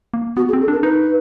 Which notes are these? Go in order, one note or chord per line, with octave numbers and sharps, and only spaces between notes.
A#3
B3 F#4
G#4
C4
A4
D4 A#4
D#4 B4